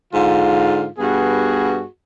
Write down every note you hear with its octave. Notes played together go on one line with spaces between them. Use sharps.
G#2 D3 F4
G2 B3 F#4 G#4